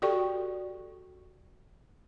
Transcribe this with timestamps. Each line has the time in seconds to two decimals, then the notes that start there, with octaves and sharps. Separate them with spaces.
0.02 F#4 G4 A4 D5 G5 C#6